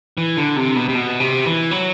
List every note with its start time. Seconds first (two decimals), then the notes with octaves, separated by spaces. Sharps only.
0.18 E3
0.37 D3
0.56 C3
0.76 B2
0.89 C3
0.95 B2
1.20 C3
1.46 E3
1.71 F#3